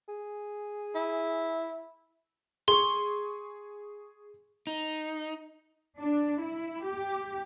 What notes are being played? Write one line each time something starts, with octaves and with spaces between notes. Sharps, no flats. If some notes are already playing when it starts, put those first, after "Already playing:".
G#4
E4
G#4 C6 C#6
D#4
D4
E4
G4